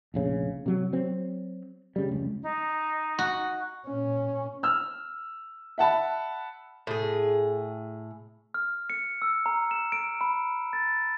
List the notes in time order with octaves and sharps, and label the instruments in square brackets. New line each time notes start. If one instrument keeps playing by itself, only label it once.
[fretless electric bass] F1 A#1 C#3
C3 F#3
F#3 C4
C#3 G3
F1 C#2
[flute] D#4
[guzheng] F#4
[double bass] A#2 C#4
[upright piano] E6 F6
E5 F#5 A5 B5
[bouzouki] A2 G#4
[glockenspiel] F6
C#7
E6
A#5
E7
D7
B5
A6